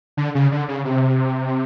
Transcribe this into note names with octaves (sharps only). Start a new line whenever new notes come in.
D3
C#3
D3
C#3
C3